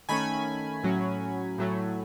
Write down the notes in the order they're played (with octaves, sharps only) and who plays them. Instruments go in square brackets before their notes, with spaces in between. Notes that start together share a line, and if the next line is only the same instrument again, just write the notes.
[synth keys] D#3 A3 C#4 G#5 B5
A2 F#3 C#4
A2 F#3 A3